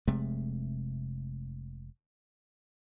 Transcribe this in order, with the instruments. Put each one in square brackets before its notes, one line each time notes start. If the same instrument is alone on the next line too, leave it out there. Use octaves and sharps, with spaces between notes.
[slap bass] F1 C3 G#3 A3